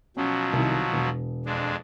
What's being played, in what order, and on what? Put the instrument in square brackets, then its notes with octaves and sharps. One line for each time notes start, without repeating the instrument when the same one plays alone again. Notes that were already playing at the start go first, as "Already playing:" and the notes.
[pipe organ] B2 F3 F#3 [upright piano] C#4
[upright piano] C2 D#3
E1
[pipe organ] F2 G#3 D4